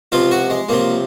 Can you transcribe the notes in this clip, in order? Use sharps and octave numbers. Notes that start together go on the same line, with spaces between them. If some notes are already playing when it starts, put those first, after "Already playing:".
C#2 C3 F3 F4
F#4
G#3
C#2 C3 F3 A#3